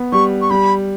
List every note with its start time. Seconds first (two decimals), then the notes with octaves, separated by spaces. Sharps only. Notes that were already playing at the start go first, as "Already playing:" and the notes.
Already playing: B3
0.12 G3 C#6
0.42 C#6
0.50 G3 B5